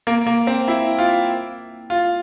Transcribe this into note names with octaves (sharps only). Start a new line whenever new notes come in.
A#3
A#3
C4
E4
F4
F4